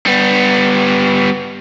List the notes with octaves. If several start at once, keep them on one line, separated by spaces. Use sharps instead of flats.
G3 B3